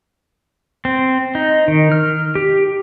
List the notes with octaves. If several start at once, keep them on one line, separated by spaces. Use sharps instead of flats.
C4
D#4
D#3
F6
G4